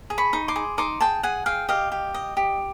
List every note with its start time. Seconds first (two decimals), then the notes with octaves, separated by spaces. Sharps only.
0.10 G#4
0.18 B5 C#6
0.33 D#4
0.48 C6 D6
0.56 G#4
0.78 D#4 C6 D6
1.00 G#4 G5 A5
1.23 G#4 F#5 G#5
1.46 G#4 F5 G5
1.69 G4 D#5 F5
1.92 G4
2.14 D#5
2.37 G4